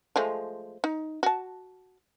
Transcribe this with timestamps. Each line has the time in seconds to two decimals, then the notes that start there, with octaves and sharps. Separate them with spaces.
0.16 F3 G#3 A3
0.84 D#4
1.23 F#4 A5